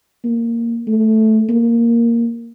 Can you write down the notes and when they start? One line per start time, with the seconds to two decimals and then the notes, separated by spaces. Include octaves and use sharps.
0.24 A#3
0.87 A3
1.49 A#3